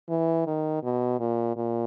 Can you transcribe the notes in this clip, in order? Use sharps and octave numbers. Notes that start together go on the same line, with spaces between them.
E3
D#3
B2
A#2
A#2